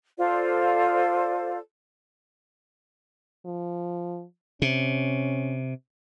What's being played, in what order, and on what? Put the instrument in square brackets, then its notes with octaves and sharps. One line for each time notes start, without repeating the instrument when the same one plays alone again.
[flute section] F4 A4 C5 D5
[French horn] F3
[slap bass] C3 [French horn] C#4